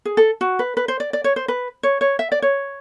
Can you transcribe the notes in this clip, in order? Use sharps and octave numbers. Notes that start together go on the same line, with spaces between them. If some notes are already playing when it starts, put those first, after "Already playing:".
G#4
A4
F#4
B4
B4
C5
D5
D5
C#5
C5
B4
C#5
C#5
E5
D5
C#5